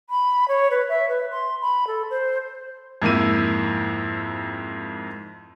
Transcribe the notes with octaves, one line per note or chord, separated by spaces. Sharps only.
B5
C#5
B4
E5
B4
C6
B5
A4
C5
F2 G#2 A#3 E4 D#7